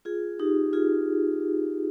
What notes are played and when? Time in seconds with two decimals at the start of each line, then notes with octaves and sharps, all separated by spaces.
0.05 F4 G#4
0.39 D#4 G4
0.73 F4 G#4